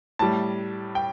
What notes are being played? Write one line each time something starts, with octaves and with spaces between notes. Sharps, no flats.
A2 G3 A5
G5